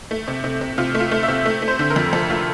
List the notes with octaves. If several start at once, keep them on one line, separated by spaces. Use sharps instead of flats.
A3
C3
C3
C3
C3 F4
A3
F4
A3
E5
C3
A3
A3
C5
D3
A#4
F2
F2 A4
A3 F4